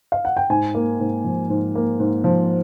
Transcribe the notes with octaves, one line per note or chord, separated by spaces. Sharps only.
F5
F#5
G5
G#2 G#5
A#3
G#2
F3
G#2
A#3
G#2
F3